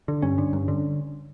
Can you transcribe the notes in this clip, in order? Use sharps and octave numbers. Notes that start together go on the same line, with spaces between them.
D3
G2 C#4
D3
G2
D3